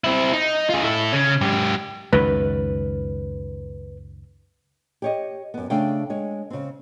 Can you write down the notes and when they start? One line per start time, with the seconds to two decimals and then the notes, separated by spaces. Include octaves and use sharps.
0.04 C4 E4
0.33 D#4
0.70 F4 G#4
0.83 E4 A4
1.13 C#3 C#4
1.41 G#2 G4
2.13 C#2 F#2 D#3 B4
5.02 G4 C#5 D#5
5.54 F#2 B3
5.70 C#3 A3 D4 F5 G5
6.10 G#3 C#5
6.50 C#3 C4